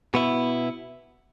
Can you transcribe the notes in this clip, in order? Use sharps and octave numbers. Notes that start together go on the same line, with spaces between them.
B2 B3 E4